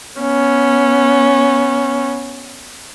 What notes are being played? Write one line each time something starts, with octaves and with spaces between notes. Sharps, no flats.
B3 C#4